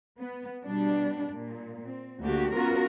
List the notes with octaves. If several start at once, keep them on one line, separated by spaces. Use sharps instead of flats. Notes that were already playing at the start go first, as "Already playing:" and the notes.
B3
B2 G3 D4
A#2
C4
D2 D3 A#3 F#4 G4
B3 C#4 F4 F#4 A#4